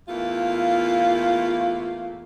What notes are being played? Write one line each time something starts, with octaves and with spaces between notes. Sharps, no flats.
E2 A3 A#3 F4